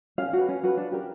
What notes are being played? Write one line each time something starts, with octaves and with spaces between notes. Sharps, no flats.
C#4 F5
F#4
B4
C#4
F#4 B4
D4
G4 A#4